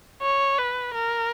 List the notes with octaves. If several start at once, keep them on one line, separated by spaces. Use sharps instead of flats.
C#5
B4
A#4